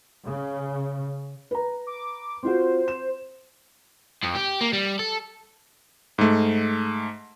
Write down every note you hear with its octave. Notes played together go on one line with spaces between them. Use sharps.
C#3
B4 A#5
D6
C4 F4 F#4 C5
E7
F2
G4
A#3
G3
A4
G#2 A3